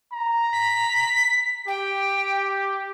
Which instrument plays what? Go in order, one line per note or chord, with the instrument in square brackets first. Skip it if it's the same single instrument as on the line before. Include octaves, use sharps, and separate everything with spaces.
[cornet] A#5
[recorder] B6
[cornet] G4 [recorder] G5